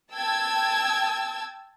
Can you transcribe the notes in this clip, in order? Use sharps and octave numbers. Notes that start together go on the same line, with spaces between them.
G5 A5 E6 G#6